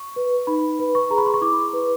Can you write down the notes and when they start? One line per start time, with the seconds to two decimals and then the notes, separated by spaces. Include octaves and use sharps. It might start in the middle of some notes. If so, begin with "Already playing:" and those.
Already playing: C#6
0.16 B4
0.47 D#4 B5
0.79 B4
0.95 C#6
1.10 G#4 A#5
1.18 B5
1.26 C6
1.34 C#6
1.41 E4 D6
1.73 B4